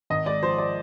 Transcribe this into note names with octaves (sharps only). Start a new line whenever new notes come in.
G#1 D#5
G#3 D5
F3 C5
D5